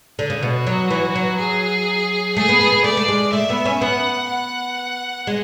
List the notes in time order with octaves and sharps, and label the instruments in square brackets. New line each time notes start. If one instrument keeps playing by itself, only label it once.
[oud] D3
C#3
[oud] B2 [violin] F#4
[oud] F#3
E3
F#3
[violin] G#4
[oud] A3 [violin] G#4
[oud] B3
B3
B3
[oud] A3 [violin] D5
[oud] A3
G#3
[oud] A3 [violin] E5
[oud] B3
C#4
[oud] B3 [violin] F#5
[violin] F#5
[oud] G#3